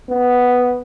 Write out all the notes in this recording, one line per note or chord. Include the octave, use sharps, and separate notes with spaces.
B3